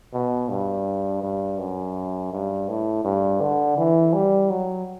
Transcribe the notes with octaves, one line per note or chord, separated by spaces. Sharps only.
B2
G2
G2
F#2
G2
A2
G2
D3
E3
G3
F#3